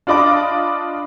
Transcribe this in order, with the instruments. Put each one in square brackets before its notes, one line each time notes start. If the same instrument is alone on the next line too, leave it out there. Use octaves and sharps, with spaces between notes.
[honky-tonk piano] D4 F4 D5 D#5 B5 D6